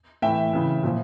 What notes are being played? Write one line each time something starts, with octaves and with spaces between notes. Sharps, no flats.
A2 E3 E5 G5
C#3 E3
A#2 F3